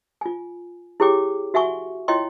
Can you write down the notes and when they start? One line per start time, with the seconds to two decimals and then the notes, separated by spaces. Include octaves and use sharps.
0.21 F4 G#5
1.00 E4 G4 G#4 C#5 G5 D6
1.54 F#4 E5 F#5 G#5 C#6
2.08 E4 F4 C#5 D#5 G5 C6